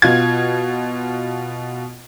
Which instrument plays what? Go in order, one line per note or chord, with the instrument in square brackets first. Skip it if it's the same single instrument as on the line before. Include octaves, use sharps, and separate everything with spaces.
[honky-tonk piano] B2 F4 G#6